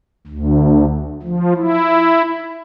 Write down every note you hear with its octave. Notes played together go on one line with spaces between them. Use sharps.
D2
F3
E4